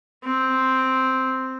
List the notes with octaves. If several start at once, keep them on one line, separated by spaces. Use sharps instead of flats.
C4